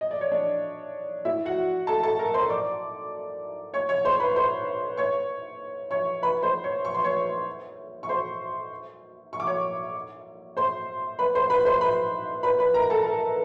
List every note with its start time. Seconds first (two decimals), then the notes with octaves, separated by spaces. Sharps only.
0.01 D#5
0.11 D5
0.21 C#5
0.32 D4 D5
1.25 E4 E5
1.45 F#4 F#5
1.87 A4 A5
2.03 A4 A5
2.19 A#4 A#5
2.34 C5 C6
2.49 D5 D6
3.74 C#5 C#6
3.89 C#5 C#6
4.05 C5 C6
4.20 B4 B5
4.36 C5 C6
4.97 C#5 C#6
5.91 C#5 C#6
6.22 B4 B5
6.43 C5 C6
6.64 C#5 C#6
6.85 C#6
6.95 C6
7.04 C#5 C#6
8.03 C#6
8.09 C5 C6
9.33 C#6
9.40 D6
9.47 C#5 C#6
10.57 C5 C6
11.19 B4 B5
11.35 C5 C6
11.50 B4 B5
11.65 C5 C6
11.81 B4 B5
12.43 B4 B5
12.59 B4 B5
12.74 A#4 A#5
12.90 A4 A5
13.05 A#4 A#5